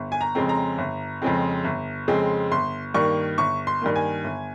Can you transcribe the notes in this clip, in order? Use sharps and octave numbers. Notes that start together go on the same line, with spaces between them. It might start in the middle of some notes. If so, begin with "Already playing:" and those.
Already playing: G1
G#5
A#5
F2 C#3 G#3 C4
A#5
G1
F2 C#3 G#3 C4
G1
F2 C#3 G#3 C4
G1 C6
G2 D#3 A#3 C#6
G1 C#6
C6
G2 D#3 A#3
G#5
G1